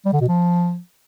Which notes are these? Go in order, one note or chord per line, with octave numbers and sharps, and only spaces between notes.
G3
D3
B2
F3